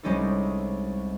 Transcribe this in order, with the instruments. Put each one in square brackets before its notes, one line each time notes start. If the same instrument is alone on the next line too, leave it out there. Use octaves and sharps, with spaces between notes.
[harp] C2 G3 G#3 C#4 D#4 A4